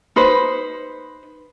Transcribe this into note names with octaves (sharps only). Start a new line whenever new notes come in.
D#4 B4 C5